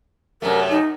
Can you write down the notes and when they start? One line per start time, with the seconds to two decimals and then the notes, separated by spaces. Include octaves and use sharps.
0.42 F#2 C3 A3 A#4
0.70 D#4